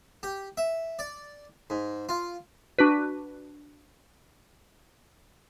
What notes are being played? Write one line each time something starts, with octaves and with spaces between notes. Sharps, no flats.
G4
E5
D5
G#2
F4
D4 F#4 B4